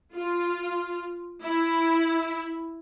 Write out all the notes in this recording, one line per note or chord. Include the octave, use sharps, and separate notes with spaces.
F4
E4